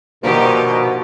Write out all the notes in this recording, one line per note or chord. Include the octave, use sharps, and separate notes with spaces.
G2 B2 D#3 F3 A#3 D#4 F#4 G4